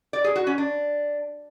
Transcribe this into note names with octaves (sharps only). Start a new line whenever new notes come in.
D5
G#4
F#4
C#4
D4